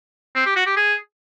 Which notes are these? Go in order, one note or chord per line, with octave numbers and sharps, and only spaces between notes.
C4
G4
F#4
G4
G#4